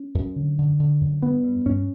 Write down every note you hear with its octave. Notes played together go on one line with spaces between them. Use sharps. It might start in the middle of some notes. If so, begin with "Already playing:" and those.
Already playing: C#4
F#2
D3
D3
D3
F#2
G2 B3
G2
G2 C#4